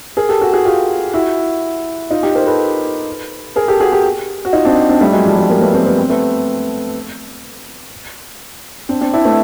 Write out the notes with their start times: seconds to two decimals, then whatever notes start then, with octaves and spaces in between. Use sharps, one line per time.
0.17 G#4 A#4
0.29 G4 A4
0.41 F#4 G#4
0.53 F#4 G#4
0.65 F4 G4
1.13 E4 F#4
2.10 D#4 F4
2.23 F4 G4
2.35 A#4 C5
2.47 A4 B4
3.56 G#4 A#4
3.68 G4 A4
3.80 F#4 G#4
3.92 G4 A4
4.45 F#4
4.53 D#4 F4
4.65 C4 D4
4.89 C4 D4
5.01 G3 A3
5.13 F#3 G#3
5.25 F3 G3
5.38 F#3 G#3
5.50 G#3 A#3
5.61 A3 B3
5.74 A#3 C4
5.86 B3
5.99 C4
6.10 A3 B3
8.89 C4 D4
9.01 C4 D4
9.13 D4 E4
9.25 A3 B3